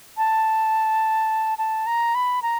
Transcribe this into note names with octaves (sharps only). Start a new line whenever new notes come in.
A5
A5
A#5
B5
A#5